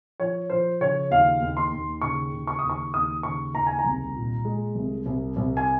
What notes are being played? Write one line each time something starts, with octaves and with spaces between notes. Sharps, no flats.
F3 C#5
F3 C5
C#3 C#5
D#2 F5
D#2
C6
D#2
C#3 C#6
C#3
C#6
D#2 D#6
C#6
D#2 D#6
C#3 C#6
D#2 A#5
G#5
A#5
C2
A#2
G#3
C2
C2
C2
G#5